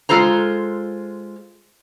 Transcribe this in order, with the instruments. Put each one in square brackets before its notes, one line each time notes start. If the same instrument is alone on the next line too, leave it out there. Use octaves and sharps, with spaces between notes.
[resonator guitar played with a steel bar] G#3 F4 A4 C5 A#5